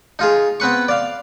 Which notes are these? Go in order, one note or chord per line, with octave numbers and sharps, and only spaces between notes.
D#4 F4 G#4
B3 C4 B4 C#6
D5 F5